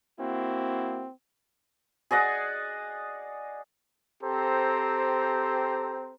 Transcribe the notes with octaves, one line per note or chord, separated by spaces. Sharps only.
A#3 C4 E4 F#4
G#4 D5 D#5 F#5
C4 G4 A4 C5 A#5